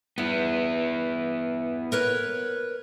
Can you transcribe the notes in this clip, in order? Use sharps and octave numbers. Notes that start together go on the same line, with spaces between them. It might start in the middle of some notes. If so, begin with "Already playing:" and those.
G2 B3 E4
A#4 B4 C#5